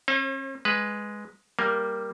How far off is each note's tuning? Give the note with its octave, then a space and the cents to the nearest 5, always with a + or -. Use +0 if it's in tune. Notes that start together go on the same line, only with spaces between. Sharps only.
C#4 -45 C5 +40
G#3 +0 B4 +0
G3 +0 A#3 +0